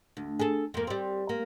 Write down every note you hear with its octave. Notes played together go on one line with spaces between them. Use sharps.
D2
G#4 A4
F2 A#3
G3 C4
A#3